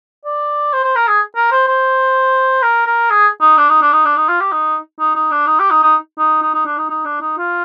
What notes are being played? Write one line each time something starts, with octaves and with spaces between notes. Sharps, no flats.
D5
C5
C5
A#4
G#4
A#4
C5
C5
A#4
A#4
G#4
D#4
D4
D#4
D4
D#4
D4
D#4
F4
G4
D#4
D#4
D#4
D4
D#4
G4
D#4
D#4
D#4
D#4
D#4
D4
D#4
D#4
D4
D#4
F4